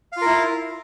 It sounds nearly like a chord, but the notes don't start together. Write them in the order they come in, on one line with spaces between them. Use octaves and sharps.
F5 F4 A#4 E4